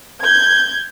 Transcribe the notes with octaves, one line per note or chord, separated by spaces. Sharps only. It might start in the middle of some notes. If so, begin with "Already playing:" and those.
G6 G#6